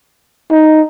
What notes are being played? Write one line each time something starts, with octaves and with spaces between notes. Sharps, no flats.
D#4